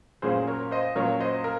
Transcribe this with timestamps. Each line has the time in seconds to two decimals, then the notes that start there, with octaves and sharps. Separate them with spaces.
0.22 A#2 F#3 A#3 C#4 G#4 C5
0.47 A#4 C#5
0.71 C5 D#5
0.96 A#2 F#3 A#3 C#4 A#4 C#5
1.20 C5 D#5
1.44 A#4